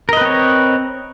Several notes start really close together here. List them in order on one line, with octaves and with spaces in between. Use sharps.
A#4 D#5 B4 C4 C#5